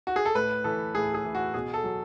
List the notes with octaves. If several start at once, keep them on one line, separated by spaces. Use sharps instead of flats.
F#4
G#4
A4
A2 B4
E3 A4
A2 G#4
G#4
E3
F#4
B2 G#4
A4
F#3